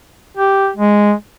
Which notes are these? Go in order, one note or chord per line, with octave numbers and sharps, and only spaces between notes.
G4
G#3